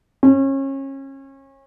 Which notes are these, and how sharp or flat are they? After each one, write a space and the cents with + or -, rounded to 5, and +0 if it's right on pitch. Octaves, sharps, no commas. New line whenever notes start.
C#4 -30